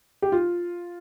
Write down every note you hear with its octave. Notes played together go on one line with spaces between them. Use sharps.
G4
F4